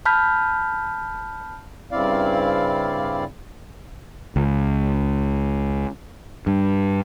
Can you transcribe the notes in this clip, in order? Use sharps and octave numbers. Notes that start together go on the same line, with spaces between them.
A5 B5 F6 G6 B6
G2 C#3 C4 E4 D5 F5
C#2
G2